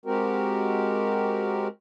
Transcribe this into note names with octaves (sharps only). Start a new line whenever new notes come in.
G#3 C4 F#4 G4 A#4